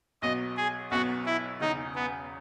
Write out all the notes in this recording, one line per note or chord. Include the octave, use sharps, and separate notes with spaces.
B1 B2 F#3 B3 D#5
G#4
B1 B2 F#3 B3 F#4
E4
E1 E2 C#3 D#4
B3